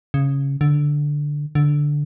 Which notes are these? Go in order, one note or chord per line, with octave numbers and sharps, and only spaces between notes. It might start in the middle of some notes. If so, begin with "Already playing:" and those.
C#3
D3
D3